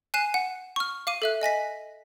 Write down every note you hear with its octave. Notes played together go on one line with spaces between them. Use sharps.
G#5 F#6 C7 D#7 E7
F#5
C#6 F6
F5 D6 D#7
A4 E5 F#6
D#5 G#5 A#6 B6